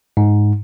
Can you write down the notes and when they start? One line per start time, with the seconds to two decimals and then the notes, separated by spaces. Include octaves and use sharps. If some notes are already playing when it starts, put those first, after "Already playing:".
0.17 G#2